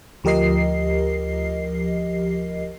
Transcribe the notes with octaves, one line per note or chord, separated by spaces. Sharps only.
D2 F3 G4 A#4 D#5 C7